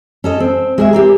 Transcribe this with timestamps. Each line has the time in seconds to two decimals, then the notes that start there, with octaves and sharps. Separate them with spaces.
0.24 C#4 A4 D#5
0.40 C4
0.78 G#3 G#4 E5
0.93 A#3 C4 G4